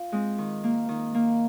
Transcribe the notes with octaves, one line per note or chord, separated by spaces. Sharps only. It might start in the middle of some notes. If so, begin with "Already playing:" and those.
Already playing: F4
G#3 C4
D#3
A#3
D#3
A#3